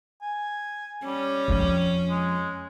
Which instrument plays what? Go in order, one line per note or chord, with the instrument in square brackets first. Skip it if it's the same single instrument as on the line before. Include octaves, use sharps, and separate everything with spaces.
[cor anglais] G#5
[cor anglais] G3 [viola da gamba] C#4
[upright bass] F2 F3
[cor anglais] G#3